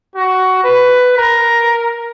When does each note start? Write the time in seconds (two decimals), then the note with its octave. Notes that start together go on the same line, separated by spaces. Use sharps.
0.15 F#4
0.64 B4
1.17 A#4